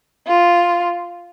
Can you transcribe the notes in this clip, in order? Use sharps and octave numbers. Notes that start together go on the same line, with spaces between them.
F4